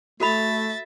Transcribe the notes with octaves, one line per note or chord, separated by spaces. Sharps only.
A3 F#4 A4 E5 B5 A6